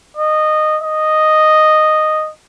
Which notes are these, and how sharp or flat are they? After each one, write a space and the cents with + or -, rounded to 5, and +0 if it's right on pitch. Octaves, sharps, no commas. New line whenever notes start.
D#5 -15
D#5 -5